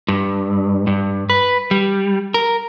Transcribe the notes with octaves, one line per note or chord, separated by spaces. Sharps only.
G2
G2
B4
G3
A#4